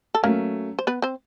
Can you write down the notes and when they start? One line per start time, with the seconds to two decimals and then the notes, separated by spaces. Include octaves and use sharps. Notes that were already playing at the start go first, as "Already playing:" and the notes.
0.15 A4
0.23 F#3 A3 A#3 C#4 A#4
0.79 C5
0.87 B3 B4
1.02 C4 C5